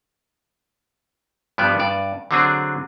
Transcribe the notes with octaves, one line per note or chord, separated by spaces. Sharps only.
G2 F3 G3 B3 D5
G2 D5
D3 F#3 C4 D4 G#4